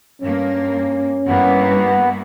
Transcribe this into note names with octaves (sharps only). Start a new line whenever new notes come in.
G2 A#3 C#4
G2 A#3 B3 E4